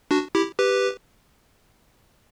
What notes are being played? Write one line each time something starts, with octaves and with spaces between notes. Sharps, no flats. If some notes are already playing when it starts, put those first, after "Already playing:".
D4 F#4
E4 G4
G4 B4